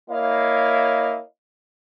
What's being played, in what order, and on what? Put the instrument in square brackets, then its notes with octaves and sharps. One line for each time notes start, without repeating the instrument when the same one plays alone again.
[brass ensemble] A#3 E4 C#5 D#5 F5